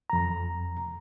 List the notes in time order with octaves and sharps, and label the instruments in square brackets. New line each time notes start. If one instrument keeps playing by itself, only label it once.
[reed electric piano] F2 A#5